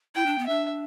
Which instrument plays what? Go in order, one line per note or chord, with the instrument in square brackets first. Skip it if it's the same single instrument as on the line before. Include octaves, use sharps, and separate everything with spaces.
[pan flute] E4 [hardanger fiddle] G5
[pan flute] D4
B3
[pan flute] D4 [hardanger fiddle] E5